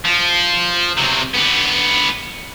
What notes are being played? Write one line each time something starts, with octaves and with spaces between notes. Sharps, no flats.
F3
C3 F#3
D3 B3